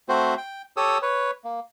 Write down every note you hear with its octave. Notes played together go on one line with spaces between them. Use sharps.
A3 C4 F#4 C5
G5
G4 A4 C#5 D#6 E6
B4 C#5
A#3